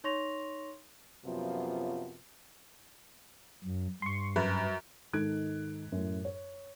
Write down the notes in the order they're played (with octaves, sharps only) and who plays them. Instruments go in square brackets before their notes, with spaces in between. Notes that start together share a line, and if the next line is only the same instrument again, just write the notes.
[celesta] D#4 C#5 C6 C#6 A#6 F7
[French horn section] F#2 C3 F3 F#3 B3 F4
[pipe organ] F#2
[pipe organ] G2 [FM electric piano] C6 C#6
[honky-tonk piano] F#2 [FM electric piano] B4
[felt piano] G#2 D#3 A4 F#6 G#6 D7
F#2 A2
C#5